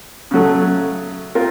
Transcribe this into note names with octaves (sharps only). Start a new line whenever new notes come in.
C#3 F#3 A3
C4 F4 A#4